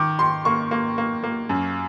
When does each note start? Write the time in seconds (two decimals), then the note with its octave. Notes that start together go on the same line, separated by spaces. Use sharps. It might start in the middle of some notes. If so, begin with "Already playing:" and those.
Already playing: D#3 D6
0.19 D#3 C6
0.45 A#3 C#6
0.71 A#3
0.98 A#3
1.23 A#3
1.49 F#2